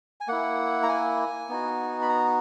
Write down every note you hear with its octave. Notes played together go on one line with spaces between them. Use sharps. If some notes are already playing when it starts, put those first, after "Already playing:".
G#5
A#3 E4 F#5
A#5
G#5
B3 D#4 F#4
B5
A#5